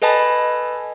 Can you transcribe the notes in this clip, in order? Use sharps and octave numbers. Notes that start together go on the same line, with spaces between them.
A4 B4 D#5 G#5 A5 B5